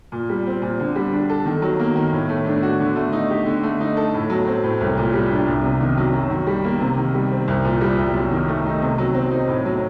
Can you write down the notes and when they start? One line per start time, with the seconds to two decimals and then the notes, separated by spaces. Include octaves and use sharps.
0.12 A#2
0.29 G3
0.46 C4
0.62 A#2
0.80 D3
0.96 G3
1.13 D4
1.29 A4
1.45 D#3
1.62 F#3
1.79 A#3
1.96 D#3
2.12 A2
2.29 A3
2.46 D4
2.63 F#4
2.80 D3
2.96 A3
3.13 D#4
3.30 G4
3.46 D3
3.63 A3
3.80 D#4
3.97 A4
4.14 A2
4.30 F#3
4.47 C4
4.63 A2
4.81 C2
4.97 A#2
5.14 G3
5.31 D4
5.47 C2
5.64 C3
5.81 D#3
5.97 F#3
6.14 F#2
6.30 D#3
6.47 G3
6.64 A#3
6.80 C3
6.97 D#3
7.14 G3
7.31 C4
7.48 C2
7.64 A#2
7.81 G3
7.98 C2
8.14 F#2
8.30 D#3
8.48 A3
8.65 D#4
8.82 C3
8.98 F#3
9.15 C4
9.31 D#4
9.47 A2
9.65 F#3